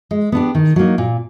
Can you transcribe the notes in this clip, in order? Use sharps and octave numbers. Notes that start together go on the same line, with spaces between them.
G#3
B3 D4 G4
D#3
F#3 A#3 D#4
A#2